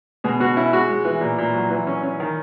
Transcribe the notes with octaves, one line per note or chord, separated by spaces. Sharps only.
B2 G#3 G#4
B2 F#4
C#4 E4
G#3 F#4
G#3
E3
A#2
A#2
F#3
E3
C#4
C#4
D#3